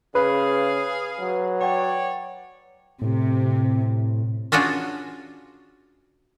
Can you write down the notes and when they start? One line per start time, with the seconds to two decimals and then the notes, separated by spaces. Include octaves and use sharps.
0.15 C#3 G#4 B4 F5
1.20 F#3
1.61 C#5 D5 F#5 G5
3.02 A2 C3
4.52 C#4 D4 F4 F#4 G#4